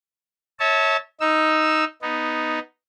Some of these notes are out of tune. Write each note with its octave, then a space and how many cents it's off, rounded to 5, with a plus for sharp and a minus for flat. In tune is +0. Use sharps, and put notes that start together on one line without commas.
C#5 +0 E5 -30 A5 +0
D#4 +5 E6 +0
B3 +0 D#4 +0